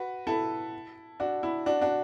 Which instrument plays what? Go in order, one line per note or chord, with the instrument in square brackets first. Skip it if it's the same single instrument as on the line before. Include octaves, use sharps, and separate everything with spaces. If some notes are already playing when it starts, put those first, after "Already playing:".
Already playing: [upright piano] F#4 B4
E4 A4
D4 F#4
E4
D4 F#4
D4 F#4